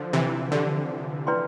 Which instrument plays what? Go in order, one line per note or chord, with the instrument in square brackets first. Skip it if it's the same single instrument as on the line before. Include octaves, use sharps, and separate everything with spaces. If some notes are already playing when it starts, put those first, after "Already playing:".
Already playing: [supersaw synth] D3 F3 [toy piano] C5
[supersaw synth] C3 E3
[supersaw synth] D3 [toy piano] E4 G4 D5 G5
[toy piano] E4 B4 D5 G5 C6